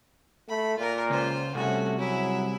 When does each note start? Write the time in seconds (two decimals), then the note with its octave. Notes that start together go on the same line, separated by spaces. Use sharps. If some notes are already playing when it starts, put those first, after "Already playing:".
0.48 A3 B5
0.78 A#2 F4 A#4
1.10 C#2 F4 C5
1.55 C2 A3 C#4 F#4
1.98 F#3 E4 G#4